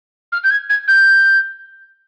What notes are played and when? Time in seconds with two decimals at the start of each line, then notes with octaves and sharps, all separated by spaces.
0.32 F6
0.44 G6
0.50 G#6
0.69 G#6
0.87 G6